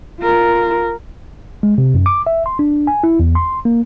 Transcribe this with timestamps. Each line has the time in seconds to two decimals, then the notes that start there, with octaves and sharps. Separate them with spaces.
0.20 F4 A#4
1.63 G#3
1.78 C3
1.94 F#2
2.06 D6
2.27 E5
2.46 C6
2.59 D4
2.87 G#5
3.04 E4
3.20 E2
3.35 C6
3.65 A#3